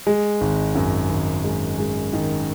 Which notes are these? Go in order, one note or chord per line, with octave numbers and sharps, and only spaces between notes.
G#3
G#1
F#2
G#1
G#3
G#3
D#3